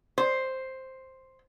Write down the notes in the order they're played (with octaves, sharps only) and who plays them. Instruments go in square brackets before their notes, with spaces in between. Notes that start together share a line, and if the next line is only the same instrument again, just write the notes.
[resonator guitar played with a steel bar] C5